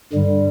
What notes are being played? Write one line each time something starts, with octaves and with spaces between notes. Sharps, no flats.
G2 D3 G3